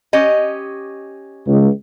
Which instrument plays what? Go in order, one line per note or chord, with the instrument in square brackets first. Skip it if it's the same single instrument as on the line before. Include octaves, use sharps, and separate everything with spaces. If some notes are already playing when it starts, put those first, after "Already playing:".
[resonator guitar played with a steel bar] C#4 G4 D#5
[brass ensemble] C#2